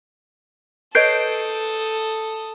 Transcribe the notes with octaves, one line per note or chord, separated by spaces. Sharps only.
A4 B4 C#5 D#5 D#6 G6 C7 D7